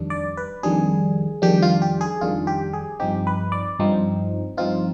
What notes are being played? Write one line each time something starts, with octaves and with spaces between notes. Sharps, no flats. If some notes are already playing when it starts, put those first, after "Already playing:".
Already playing: F2 D#3 G3 D4
D5
B4
F2 D#3 G3 D4 G#4
F2 D#3 G3 D4 G4
F4
G4
G#4
F2 D#3 G3 D4 F4
G4
G#4
G2 F3 C4 D#4 G4
B4
D5
G2 F3 C4 D#4
G2 F3 C4 D#4 F4